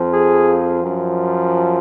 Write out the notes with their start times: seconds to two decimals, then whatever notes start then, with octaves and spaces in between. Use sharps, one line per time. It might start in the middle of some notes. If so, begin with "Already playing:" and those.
Already playing: F2 F3
0.12 G#4
0.81 F#2 F3